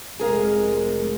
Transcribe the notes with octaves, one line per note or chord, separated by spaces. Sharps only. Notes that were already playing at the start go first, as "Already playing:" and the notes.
F1 G#3 G#4 A#4 F5